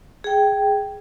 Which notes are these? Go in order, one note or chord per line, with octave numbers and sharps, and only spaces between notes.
G#4 G5